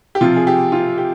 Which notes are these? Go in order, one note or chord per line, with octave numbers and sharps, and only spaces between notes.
G4
C3 F3 F4
G#4
G4
F4
G4